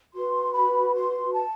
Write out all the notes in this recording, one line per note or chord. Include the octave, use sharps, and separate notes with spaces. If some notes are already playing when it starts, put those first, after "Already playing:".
F#4 B4 C6
B5
C6
A5